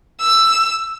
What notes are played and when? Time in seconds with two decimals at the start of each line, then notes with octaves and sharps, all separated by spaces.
0.21 E6